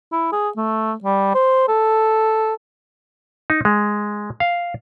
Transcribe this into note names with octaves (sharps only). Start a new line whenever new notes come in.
E4
G#4
A3
G3
C5
A4
D#4
G#3
F5